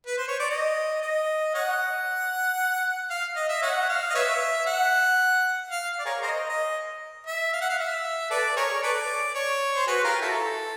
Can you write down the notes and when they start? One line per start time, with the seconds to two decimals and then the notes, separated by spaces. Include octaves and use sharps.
0.06 B4
0.18 C5
0.28 C#5
0.40 D5
0.50 D#5
1.02 D#5
1.54 C#5 D#5 F#5
3.10 F5
3.36 D#5
3.49 E5
3.62 C#5 D#5 F#5
3.89 F5
4.10 D#5
4.15 B4 C#5 E5
4.67 F#5
5.71 F5
5.99 D5
6.05 G#4 A#4 C#5
6.22 A#4 C5 D#5
6.49 D#5
7.27 E5
7.53 F5
7.61 F#5
7.69 F5
7.79 E5
8.31 A4 B4 D5
8.57 G#4 A#4 C#5
8.83 A4 B4 D5
9.35 C#5
9.76 C5
9.87 F#4 G#4 B4
10.04 F4 G4 A#4
10.22 E4 F#4 A4